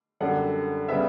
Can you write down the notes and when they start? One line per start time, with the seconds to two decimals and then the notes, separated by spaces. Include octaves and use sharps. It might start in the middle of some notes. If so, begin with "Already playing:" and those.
0.20 F#2 D3 G3 F#5
0.88 C#3 G3 B3 E5